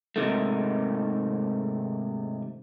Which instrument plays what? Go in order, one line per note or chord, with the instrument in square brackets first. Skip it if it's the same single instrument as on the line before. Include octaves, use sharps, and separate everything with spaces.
[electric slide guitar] G#2 C3 D#3 A3